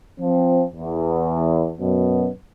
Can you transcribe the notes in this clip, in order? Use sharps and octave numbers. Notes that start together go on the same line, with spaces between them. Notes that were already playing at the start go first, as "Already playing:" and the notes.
F3 C4
E2
F#2 B2 B3